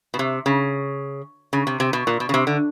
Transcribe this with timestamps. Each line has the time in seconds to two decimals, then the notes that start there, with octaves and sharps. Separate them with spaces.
0.14 B2
0.19 C3
0.46 C#3
1.53 C#3
1.67 C3
1.80 C3
1.93 B2
2.07 A#2
2.20 B2
2.29 C#3
2.34 C3
2.47 D3